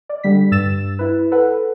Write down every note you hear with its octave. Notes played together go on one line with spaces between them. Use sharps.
D5
D3 G3 B6
G2 E6 A6 E7
E4 B4
A4 B4 F#5